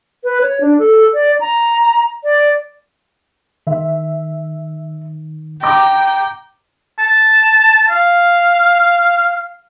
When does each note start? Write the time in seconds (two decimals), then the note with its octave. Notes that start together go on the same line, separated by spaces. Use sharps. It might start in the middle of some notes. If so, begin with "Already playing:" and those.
0.24 B4
0.41 C#5
0.61 D4
0.79 A4
1.14 D5
1.40 A#5
2.24 D5
3.67 D#3 E5
5.63 G5 A#5 D6 A#6
6.99 A5
7.90 F5